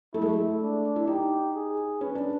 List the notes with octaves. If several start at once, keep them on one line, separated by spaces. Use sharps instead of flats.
A3 E4
G#3
A3
D4
E4
D#4 G4
G#4
C#4 B4
D4